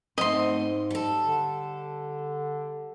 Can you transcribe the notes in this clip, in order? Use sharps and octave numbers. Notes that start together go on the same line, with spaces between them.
G#2 A3 B3 C4 D#5 C6
G3 A4
D3